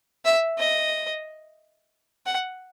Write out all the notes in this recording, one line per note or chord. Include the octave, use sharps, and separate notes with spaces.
E5
D#5
F#5